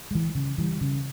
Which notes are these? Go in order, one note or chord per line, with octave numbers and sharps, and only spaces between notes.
E3 G#3
C#3
E3 G3
C#3